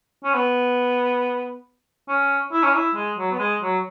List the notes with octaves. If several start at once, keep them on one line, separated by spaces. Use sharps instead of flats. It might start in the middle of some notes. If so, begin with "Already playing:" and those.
C#4
B3
C#4
E4
C#4
E4
G#3
F#3
B3
G#3
F#3